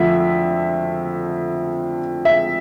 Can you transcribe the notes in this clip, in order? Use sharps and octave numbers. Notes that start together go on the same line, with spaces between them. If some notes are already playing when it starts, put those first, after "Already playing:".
Already playing: F2 D3 F3 A3 E5
E5